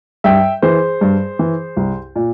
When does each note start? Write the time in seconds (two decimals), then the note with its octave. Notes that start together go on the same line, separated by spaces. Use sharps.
0.24 G2 E5 G5
0.62 E3 G#4 C5
1.01 G2
1.39 E3
1.77 C2
2.15 A#2